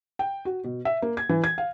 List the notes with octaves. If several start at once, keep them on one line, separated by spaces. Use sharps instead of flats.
G5
F#4
B2
E5
A#3
G#6
E3
G#6
F5